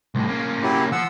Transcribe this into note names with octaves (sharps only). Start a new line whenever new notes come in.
C2 A2
A#3 C#4
F#3 E4 G4
F3 F#5 E6